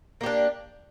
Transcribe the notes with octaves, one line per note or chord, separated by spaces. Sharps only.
A#3 D4 G4